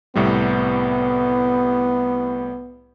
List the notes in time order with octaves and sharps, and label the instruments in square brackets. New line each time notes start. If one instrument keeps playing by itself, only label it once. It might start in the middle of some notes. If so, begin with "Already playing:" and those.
[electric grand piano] C2 A2 G3 [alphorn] B3